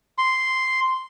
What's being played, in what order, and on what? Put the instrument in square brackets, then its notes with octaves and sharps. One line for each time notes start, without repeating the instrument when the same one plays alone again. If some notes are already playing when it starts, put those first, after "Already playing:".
[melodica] C6